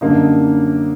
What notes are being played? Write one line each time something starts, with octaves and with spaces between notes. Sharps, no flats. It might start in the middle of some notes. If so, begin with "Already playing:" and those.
F#2 D3 G3 A#3 D#4